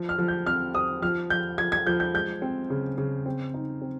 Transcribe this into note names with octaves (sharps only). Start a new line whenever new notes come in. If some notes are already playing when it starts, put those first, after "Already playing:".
Already playing: F3
F6
F3
G6
C4 F6
C4 D#6
F3 F6
F3 G6
F3 G#6
G#6
F3 G6
G6
G#3 G6
C4
C#3
C#3
C4
D#4
C4